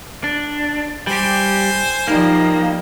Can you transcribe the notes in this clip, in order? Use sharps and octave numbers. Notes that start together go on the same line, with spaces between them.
D4
G3 G4 C5 G#5
F3 G3 A#3 D#4